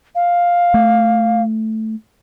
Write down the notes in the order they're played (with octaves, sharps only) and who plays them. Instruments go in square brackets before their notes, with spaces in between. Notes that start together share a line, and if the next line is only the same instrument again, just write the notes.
[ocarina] F5
[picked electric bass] A3